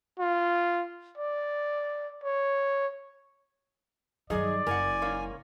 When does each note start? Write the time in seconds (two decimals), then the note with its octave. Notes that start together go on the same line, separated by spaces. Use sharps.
0.19 F4
1.17 D5
2.24 C#5
4.30 G2 D#3 F#3 D#4 G#4 D5 D#5
4.67 F#1 A#4 F#5 G#5
5.02 G#2 A#3 C#4